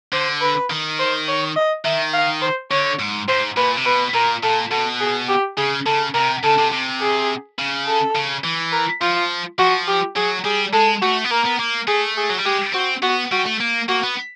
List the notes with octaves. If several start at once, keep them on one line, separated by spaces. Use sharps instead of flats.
D3 C5
B4
D#3
C5
C#5
D#5
D#3 E5
F5
C5
D3 C#5
G#2
G#2 C5
A#2 B4
C3
B2 B4
A#2 A#4
A#2 A4
B2 A4
G#4
G4
C#3 G#4
C#3 A4
C3 A#4
C#3 A4
C3
C3
G#4
C#3
A4
C#3
E3
A#4
F3 F4
F3 F#4
G4
F#3 G#4
G3 G#4
G#3 A4
A3 F#4
B3
A#3 A#4
B3
A#3
A3 G#4
G#4
F#3
G3
G#3 G4
C4 F#4
B3 F#4
G3 F#4
A3
A#3
A#3 F#4
B3